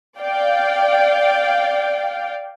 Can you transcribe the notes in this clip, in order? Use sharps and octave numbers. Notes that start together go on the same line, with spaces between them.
D5 F5 G5